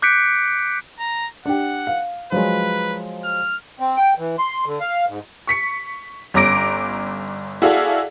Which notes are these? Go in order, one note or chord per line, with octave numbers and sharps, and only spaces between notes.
D6 F#6 G6 B6 C#7 D7
A#5
D4 G4 F#5
F5
F3 F#3 G#3 B4
F6
C4
G5
E3
C6
D3
F5
G#2
C#6 B6 C#7
G1 C#4 A#5 D6 A#6 D7
E4 F#4 G#4 A4 D5 F5